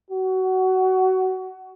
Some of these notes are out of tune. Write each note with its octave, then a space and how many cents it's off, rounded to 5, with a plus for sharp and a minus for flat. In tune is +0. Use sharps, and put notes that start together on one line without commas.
F#4 +20